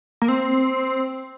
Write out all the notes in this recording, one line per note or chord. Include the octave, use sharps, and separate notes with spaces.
A#3
C4